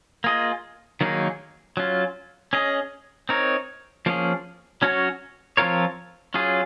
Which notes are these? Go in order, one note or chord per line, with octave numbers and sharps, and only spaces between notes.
A#3 F4 G#4 D#5
D#3 F#3 A#3 D#4 G#4
F#3 C#4 F4
C#4 G#4 D#5
C4 D#4 A#4 C#5
F3 A#3 C#4 G#4
F#3 C#4 F#4 C#5
F3 C4 F4 A#4 C#5
F#3 C#4 F4 G#4